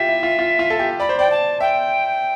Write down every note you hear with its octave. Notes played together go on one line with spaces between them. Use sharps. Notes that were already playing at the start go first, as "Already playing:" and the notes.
Already playing: F4 G4 E5
E4
F4
F4
F4
A4
G4
D5 B5
C5
D5 G5
A5
E5 G5